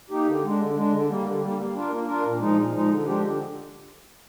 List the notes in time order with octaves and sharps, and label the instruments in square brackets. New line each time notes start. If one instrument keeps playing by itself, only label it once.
[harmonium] A#3 D#4 G4
D3
G#3 D4
D3
G#3 D4
D3
G3 A#3
D3
G3 A#3
A#3
D4 F4 A#4
A#3
D4 F4 A#4
A#2
F3 G#3 D#4
A#2
F3 G#3 D#4
D3
F3 G#3 D4 G4
D3